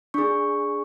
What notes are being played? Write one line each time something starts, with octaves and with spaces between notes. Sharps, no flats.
D4 G#4 C#6